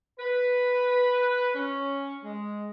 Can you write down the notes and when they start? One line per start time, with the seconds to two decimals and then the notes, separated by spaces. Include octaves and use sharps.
0.19 B4
1.54 C#4
2.23 G#3